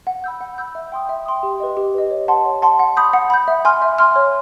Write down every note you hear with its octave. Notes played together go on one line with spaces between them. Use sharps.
F#5
B5 E6 G6
F#5
B5 E6 G6
E5
G5 C6 D#6
E5
G5 C6 D#6
G4
B4 D#5
G4
B4 D#5
C#5
F#5 A5 C6
C#5
F#5 A5 C6
F#5
B5 D#6 G6
F#5
B5 D#6 G6
E5
G#5 C6 F6
E5
G#5 C6 F6
C#5